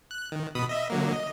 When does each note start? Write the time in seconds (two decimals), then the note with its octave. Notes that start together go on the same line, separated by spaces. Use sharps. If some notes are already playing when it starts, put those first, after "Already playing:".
0.11 F#6
0.32 D#3
0.55 B2 B5 D#6
0.69 D#5 E5
0.90 D3 F#3 A#3
1.12 D#5